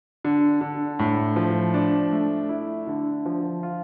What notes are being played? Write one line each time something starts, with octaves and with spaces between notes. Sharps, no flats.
D3
D3
A2
F3
D4
A3
E4
D3
F3
F4